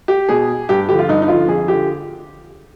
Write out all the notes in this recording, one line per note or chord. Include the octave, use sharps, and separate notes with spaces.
G4
B2 G#4
G2 G4
D3 G4
F3 F4
G2 D#4
D#4
D3 F3 F4
F2 G#4
D3 F3 G4